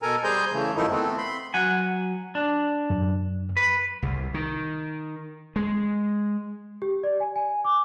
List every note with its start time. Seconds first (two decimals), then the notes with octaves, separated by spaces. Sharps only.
0.02 B2 A4 A#4 G#5 A#5
0.24 G3 G#4 C5 G#5 A#5 G6
0.52 C#3 E3 A3
0.76 F#2 D#3 F3 A3 D#4 E4
0.90 A3 B3 C4
1.18 B5 C6
1.54 F#3 F#5 G#5
2.35 D4
2.90 F#2
3.57 B4
4.02 C2
4.34 D#3
5.56 G#3
6.82 G4
7.03 D5
7.20 G#5
7.36 G#5
7.65 D6